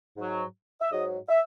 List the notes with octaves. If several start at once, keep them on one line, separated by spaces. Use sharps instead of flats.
G#2 F#3
E5
G#2 F#3 D#5
E5